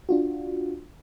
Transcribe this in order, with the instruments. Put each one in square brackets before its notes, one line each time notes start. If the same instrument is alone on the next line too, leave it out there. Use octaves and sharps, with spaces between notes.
[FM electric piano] D4 F4 F#4